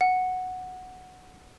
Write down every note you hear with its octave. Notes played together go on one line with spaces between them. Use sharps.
F#5